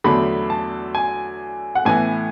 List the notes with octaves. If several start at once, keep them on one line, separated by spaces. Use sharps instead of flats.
E2 D3 F#3 A3 B5
A5
G#5
F#5
A2 E3 B3 G#5